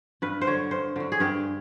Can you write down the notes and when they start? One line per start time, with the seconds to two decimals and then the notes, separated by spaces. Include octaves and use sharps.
0.22 G2 B4
0.41 C5
0.47 D3 F#3 C#5
0.71 G2 C5
0.96 D3 F#3
1.12 G#4
1.20 G2 G4